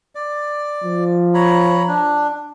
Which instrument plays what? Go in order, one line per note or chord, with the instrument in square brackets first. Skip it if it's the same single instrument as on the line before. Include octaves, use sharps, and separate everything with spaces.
[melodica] D5
[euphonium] F3
[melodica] C#5 A#5 B5
D4